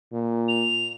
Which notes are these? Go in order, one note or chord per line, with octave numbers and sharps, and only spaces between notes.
A#2
F7